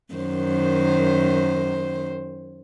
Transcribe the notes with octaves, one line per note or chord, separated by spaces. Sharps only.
F#2 D#3 C5